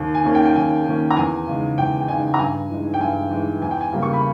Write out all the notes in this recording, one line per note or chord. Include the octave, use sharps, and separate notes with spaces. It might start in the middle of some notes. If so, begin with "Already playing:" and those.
Already playing: D#2
G#5
D#3 A#3 C#4
G5
G5
D#2 G#5
D#3 A#3 C#4
A#5
E2 G#5
C#3 G#3 D#4
E2 G5
G5
C#3 G#3 D#4 G#5
A#5
G2 G#5
E3 G#3 D#4
G5
G2 G#5
E3 G#3 D#4
E2 G#5
G5
G#5
C#3 G3 A#3
C#6
B5